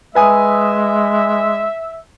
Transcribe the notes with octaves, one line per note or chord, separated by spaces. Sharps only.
G#3 B4 E5 G#5 D#6